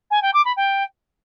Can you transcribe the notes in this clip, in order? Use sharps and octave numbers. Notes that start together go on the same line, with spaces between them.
G#5
G5
D6
B5
G5